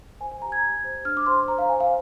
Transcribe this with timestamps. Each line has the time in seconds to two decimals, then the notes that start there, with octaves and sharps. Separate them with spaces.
0.20 C5 G#5
0.32 G#5
0.42 G4 A#5
0.52 G#6
0.63 G4
0.84 C5
1.05 D4 F6
1.17 D6
1.26 C5 C6
1.48 C5 A#5
1.58 F5
1.69 C5 G#5
1.80 F5